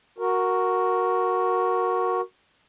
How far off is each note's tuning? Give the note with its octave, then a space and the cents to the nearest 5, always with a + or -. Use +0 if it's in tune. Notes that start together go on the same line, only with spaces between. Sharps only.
F#4 +0 A#4 +0